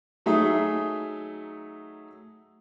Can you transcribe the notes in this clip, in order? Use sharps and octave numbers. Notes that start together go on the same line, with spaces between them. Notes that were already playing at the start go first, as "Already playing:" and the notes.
F#3 A3 D#4 G#4 E5